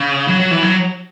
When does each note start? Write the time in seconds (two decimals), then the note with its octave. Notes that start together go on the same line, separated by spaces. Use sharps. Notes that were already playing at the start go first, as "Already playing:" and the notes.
Already playing: C#3
0.28 F#3
0.39 F#3
0.51 E3
0.63 F#3